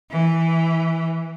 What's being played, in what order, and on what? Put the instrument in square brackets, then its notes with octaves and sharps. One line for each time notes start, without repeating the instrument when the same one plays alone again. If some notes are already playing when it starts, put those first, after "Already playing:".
[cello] E3